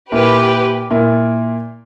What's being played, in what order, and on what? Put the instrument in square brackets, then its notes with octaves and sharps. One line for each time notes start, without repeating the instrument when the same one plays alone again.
[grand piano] A#2 A#3 E4 [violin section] G4 B4
[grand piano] A#2 A#3 E4